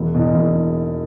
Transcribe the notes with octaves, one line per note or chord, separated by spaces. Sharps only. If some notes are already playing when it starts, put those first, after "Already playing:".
Already playing: E1
E2 B2
E1